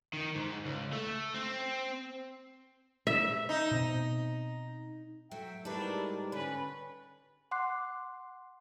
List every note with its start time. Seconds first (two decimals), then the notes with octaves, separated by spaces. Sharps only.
0.13 D#3
0.35 G#2
0.65 C#2
0.93 A3
1.35 C4
3.07 E5
3.49 D#4
3.71 B2 C4
5.31 F#3 A3 E5 G5
5.65 G#2 G3 A3 D4 E4 A#4 B4
6.32 D3 C#4 B4
7.51 F#5 C6 D6 F#6 C7